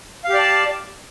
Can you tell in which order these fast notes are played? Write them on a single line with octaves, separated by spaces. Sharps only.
F5 G4 D5 A5